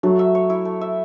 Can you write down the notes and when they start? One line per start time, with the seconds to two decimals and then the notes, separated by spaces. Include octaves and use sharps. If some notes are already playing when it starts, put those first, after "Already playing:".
0.03 F#3 A3
0.19 E5
0.35 C#5
0.50 E4
0.65 A3
0.81 E5